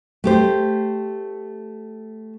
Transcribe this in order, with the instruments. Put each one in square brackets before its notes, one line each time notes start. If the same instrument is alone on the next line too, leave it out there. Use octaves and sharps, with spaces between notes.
[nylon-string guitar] A3 G4 C5